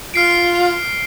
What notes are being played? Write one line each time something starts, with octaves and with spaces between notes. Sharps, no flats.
F4 F6 C7 D7